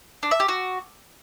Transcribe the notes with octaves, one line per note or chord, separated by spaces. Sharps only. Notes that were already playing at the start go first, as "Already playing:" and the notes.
D4
E5
G4
F#4